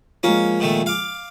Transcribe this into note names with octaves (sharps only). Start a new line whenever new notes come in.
F3 G#3 A#3 C#4
A#2 D#3 A3
F5 D6